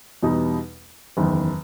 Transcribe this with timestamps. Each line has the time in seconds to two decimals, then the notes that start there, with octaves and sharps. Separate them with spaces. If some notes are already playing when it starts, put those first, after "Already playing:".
0.23 E2 B2 G3 D#4
1.17 F#1 E2 D#3